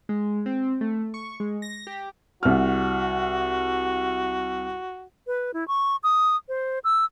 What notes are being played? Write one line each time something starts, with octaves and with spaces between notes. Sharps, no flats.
G#3
C4
A3
C#6
G#3
A#6
G4
C2 F#4 F6
B4
E4
C#6
D#6
C5
E6